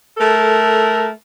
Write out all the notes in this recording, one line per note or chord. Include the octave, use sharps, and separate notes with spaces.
A3 A4 A#4